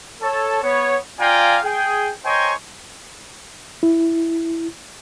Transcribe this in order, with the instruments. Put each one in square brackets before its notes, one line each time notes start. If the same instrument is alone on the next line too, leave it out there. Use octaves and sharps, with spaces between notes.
[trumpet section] A4 C#5 A5
B3 C#5
F4 D5 F5 G5 G#5 A#5
G#4 G5
A#4 C5 C#5 D#5 G5 G#5
[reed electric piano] E4